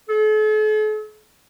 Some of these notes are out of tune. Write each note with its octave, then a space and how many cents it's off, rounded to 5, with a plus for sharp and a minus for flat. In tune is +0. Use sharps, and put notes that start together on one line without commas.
A4 -45